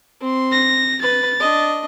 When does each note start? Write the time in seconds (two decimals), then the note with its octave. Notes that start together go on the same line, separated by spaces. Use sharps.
0.20 C4 C6
0.52 A#6
1.02 B4 A6
1.40 D4 D#5